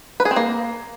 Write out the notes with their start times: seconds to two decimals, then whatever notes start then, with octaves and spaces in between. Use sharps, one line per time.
0.20 B4
0.25 G#4
0.31 C4
0.36 A#3